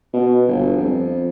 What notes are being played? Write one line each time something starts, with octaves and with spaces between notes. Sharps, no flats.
B2
G1
F2